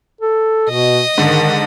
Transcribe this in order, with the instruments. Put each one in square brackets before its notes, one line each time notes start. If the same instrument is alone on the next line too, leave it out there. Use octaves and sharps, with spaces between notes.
[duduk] A4
[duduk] B2 [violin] D#5
[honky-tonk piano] G#2 D3 [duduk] D#3